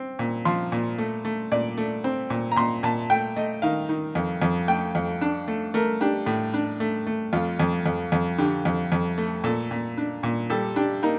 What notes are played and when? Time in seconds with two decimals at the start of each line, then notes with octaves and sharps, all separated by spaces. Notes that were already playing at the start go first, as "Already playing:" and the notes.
Already playing: C4
0.19 A#2
0.45 F3 C6
0.72 A#2
0.98 A3
1.25 A3
1.52 A#2 D5
1.77 A3
2.04 C4
2.30 A#2
2.52 A#5
2.56 A#2 C6
2.83 A#2 A5
3.10 A3 G5
3.36 A3 D#5
3.62 D#3 F5
3.89 D#3
4.15 F2
4.42 F2
4.68 A3 G5
4.95 F2
5.21 D4
5.48 A3
5.74 A3 A#4
6.01 D4 G4
6.26 A2
6.54 D4
6.80 A3
7.07 A3
7.33 F2 F4
7.60 F2
7.86 F2
8.12 F2
8.38 D3 G4
8.65 F2
8.92 F2
9.18 A3
9.44 A#2 A4
9.71 A#2
9.97 D4
10.23 A#2
10.50 G3 A4
10.76 D4 G4
11.03 A#3 D#4